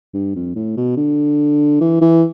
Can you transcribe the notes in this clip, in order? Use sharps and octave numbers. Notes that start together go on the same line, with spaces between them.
G2
F2
A2
B2
D3
E3
E3